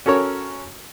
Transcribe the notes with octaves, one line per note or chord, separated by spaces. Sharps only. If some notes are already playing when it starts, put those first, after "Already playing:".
C#4 F#4 A4 A#4 C#5